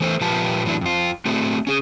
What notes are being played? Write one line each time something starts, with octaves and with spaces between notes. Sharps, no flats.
E3 A3 A4 C5
A#2 F3 F4 G4 B4 A5
A2 E3 F#3 D4
F2 F4
A3 C4 F#4 A4
C#4 G#4